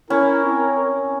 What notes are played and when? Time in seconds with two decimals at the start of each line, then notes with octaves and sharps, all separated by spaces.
0.10 C#4 E4 A#4
0.45 C4